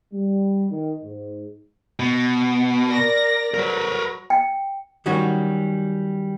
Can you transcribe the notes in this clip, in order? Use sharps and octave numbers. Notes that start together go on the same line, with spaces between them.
G3
D#3
G#2
B2
A#4 D5 A#6
F#3 A#4 B4
G5
D#3 F#3 G3 C#4 F#4